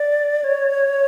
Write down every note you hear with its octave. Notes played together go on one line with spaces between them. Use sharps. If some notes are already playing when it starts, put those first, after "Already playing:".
Already playing: D5
C#5